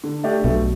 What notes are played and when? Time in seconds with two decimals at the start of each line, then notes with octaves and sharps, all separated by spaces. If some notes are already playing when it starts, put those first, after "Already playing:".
0.04 D3
0.23 A3 D4 G4
0.44 B1 B2 A3